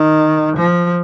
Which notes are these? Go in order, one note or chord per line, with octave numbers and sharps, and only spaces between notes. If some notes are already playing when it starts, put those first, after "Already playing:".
Already playing: D#3
F3